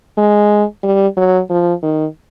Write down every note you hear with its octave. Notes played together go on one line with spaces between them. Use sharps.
G#3
G3
F#3
F3
D#3